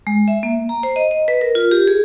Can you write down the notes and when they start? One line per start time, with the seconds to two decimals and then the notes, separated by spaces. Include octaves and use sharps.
0.07 G#3
0.28 E5
0.43 A#3
0.69 A#5
0.83 C5
0.96 D#5
1.11 D#5
1.28 B4
1.41 A#4
1.55 F4
1.71 G4
1.88 G#4